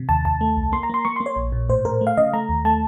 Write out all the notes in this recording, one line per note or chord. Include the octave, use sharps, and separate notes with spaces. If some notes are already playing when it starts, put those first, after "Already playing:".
Already playing: C3
D#2 A5
D#2 A5
A3
C2
A#3 C6
A#5
A#3 C6
A#3 C#6
A#3 C6
C#5
A#1
A#2
A2 C5
A2 A#4
A3
F5
C#3 D#5
A3 A#5
D#2
A3 A5